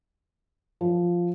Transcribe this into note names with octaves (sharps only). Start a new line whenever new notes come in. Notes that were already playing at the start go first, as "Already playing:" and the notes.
F3